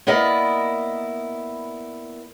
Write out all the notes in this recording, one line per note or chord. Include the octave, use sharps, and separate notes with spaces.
A#3 B3 E4 A#4 D5 D#5